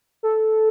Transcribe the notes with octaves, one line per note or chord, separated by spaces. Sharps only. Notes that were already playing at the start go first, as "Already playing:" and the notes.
A4